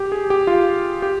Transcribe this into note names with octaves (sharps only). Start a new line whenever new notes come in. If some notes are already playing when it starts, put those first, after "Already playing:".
Already playing: G4
G#4
G4
F4
G4